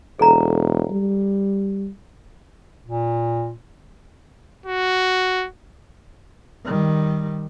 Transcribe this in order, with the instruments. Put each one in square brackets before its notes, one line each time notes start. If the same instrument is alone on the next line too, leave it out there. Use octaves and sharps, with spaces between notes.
[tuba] E1 [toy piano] A4 A#5
[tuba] G3
[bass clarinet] A#2
[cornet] F#4
[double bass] D#3 G3